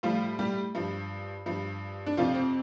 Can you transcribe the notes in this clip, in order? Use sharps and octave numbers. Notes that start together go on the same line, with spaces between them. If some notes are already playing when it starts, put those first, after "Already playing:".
A2 F3 G3 F4
G3 G4
G2 F3
G2 F3
D4
F2 C3 F3 F4
C4